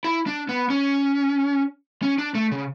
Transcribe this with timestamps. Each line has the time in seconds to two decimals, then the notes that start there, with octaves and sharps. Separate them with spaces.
0.04 E4
0.27 D4
0.49 B3
0.70 C#4
2.02 C#4
2.18 D4
2.35 A3
2.52 C#3